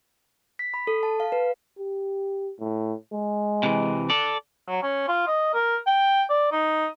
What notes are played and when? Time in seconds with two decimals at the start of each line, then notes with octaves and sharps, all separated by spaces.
0.59 B6
0.74 B5
0.87 A4
1.03 A5
1.20 F5
1.32 B4
1.78 G4
2.59 A2
3.13 G#3
3.63 C3 E3
4.10 A4 D5
4.68 F#3
4.83 C#4
5.08 F4
5.28 D#5
5.54 A#4
5.87 G5
6.30 D5
6.52 D#4